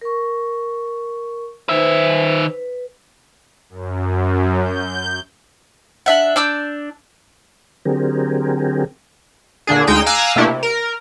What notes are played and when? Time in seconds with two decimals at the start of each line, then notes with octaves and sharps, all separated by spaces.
0.01 A#4 C#6
1.69 D#3 D#4 B4 C5 E5
2.50 B4
3.70 F#2
4.62 G6
6.06 D4 E5 F#5
6.36 D4 D6 E6 G6
7.85 D3 F#3 C4 G4 G#4 A#4
9.67 A#2 D3 D4 G#4
9.87 D2 G#3 D#4 G5 E6 D#7
10.06 F5 G#5 A#5 D6 E6 F#6
10.36 B2 A3 A#3 D4 E4 G4
10.47 C3
10.63 A#4